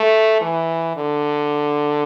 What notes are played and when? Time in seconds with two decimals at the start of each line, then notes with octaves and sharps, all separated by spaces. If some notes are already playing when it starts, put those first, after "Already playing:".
Already playing: A3
0.41 E3
0.96 D3